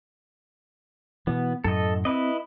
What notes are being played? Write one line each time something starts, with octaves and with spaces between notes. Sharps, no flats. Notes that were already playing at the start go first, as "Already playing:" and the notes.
B2 E3 B3
F#2 A2 A4 D#5
C4 E4 B4 D#5